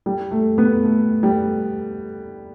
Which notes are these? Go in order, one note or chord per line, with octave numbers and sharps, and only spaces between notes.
G3
A3
B3
A3
G3